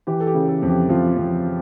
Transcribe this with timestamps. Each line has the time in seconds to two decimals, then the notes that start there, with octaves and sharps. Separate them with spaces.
0.07 E3 G4
0.20 A4
0.27 G4
0.34 C#3
0.48 A4
0.62 F2
0.69 G4
0.89 F2 F4
1.17 F2